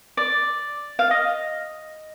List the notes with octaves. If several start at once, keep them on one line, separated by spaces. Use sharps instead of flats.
D5
F5
D#5